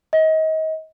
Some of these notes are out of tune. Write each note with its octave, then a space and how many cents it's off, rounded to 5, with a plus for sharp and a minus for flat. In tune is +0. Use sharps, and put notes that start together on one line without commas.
D#5 +30